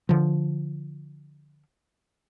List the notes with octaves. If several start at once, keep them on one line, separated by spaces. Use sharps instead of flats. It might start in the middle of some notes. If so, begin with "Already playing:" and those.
D3 F3